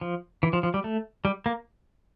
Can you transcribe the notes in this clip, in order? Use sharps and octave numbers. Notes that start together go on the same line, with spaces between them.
F3
E3
F3
F3
G3
A3
G3
A#3